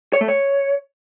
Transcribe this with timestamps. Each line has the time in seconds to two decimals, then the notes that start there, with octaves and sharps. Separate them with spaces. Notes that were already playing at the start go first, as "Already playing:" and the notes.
0.13 C#5
0.21 A3
0.28 C#5